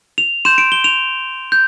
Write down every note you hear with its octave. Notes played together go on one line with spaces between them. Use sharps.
F7
C6 G6 E7
D7
G7
F7
G6